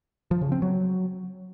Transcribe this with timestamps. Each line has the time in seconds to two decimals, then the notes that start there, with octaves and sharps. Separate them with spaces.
0.31 F3
0.41 C#3
0.52 C4
0.62 F#3